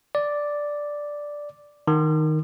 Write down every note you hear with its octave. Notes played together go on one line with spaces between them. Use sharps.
D5
D#3